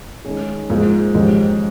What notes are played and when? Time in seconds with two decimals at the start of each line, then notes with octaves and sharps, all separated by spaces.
0.25 D#3 G#3 C#4 G#4
0.69 G#2 F3 A#3 F4 G#4
1.14 F2 G#2 D#3 A#3 C#4 G4